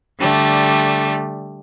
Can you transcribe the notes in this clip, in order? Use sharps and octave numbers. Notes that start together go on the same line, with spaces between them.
D3 G3 A3